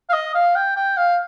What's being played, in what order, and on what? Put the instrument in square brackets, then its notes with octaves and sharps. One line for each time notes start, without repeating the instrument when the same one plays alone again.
[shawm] F5
D#5
F5
G5
G5
F5